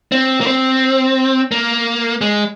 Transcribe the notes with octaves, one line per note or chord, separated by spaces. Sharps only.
C4
A#3
C4
A#3
G#3